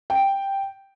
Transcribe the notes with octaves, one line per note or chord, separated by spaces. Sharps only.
G5